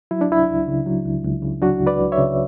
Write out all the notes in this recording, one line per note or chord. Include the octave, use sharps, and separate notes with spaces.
F#3 E4
D4
C#2 E4
C#2
C#3
F#3
C#2
C#2
C#3
F#3 D4 F#4
C#2
B4 D5
C#2
C#5 E5
C#3